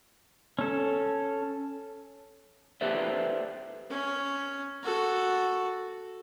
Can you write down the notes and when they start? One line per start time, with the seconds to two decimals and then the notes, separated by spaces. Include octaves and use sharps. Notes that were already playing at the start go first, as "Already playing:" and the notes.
0.59 C#4 A4
2.81 G4 A4 B4 C5 D5 E5
3.90 C#4
4.83 F#4 A4